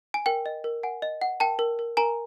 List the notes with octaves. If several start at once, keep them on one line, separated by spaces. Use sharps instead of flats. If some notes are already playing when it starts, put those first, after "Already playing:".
G#5
A#4 G5
D#5
A#4
F#5 G#5
D#5
F#5
A#4 G5 A5
A#4
A#4
A#4 G#5 A#5